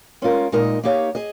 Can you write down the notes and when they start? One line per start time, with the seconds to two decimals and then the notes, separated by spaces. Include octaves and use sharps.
0.22 G#3 C#4 F4 A#4
0.52 A#2 G#3 D#4 A#4 D#5
0.83 A#3 D#4 G4 C#5 F5
1.15 G#4 D#5